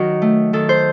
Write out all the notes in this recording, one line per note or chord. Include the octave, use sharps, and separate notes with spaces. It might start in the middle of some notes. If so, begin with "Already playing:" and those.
Already playing: D#3 F#3 F#4 A#4 D#5
A3
D#3 A4
C5